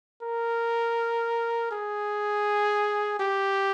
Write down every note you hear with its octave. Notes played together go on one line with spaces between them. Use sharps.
A#4
G#4
G4